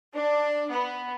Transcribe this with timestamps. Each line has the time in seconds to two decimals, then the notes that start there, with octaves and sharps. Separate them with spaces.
0.13 D4
0.70 B3